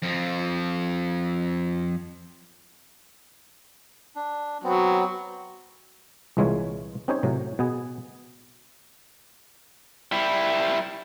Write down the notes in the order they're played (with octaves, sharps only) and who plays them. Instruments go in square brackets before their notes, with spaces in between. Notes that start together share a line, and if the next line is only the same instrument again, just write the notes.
[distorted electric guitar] F2 F3
[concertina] D4
[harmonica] F#3 [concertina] B3 C4
[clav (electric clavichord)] C2 A#2 E3 G#3 F4 C#5
C4 C#4 D#4 G4 C5 C#5
A2 C3 F#3
B2 B3 G#4
[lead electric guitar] G3 E4